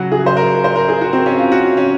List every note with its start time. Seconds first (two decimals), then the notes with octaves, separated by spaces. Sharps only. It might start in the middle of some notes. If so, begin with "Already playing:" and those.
Already playing: C#3 F#3 F#4
0.12 G#4
0.26 C5
0.37 A#4
0.64 C5
0.76 A#4
0.89 G#4
1.01 F#4
1.13 C4
1.26 C#4
1.38 F4
1.52 F#4
1.77 C#4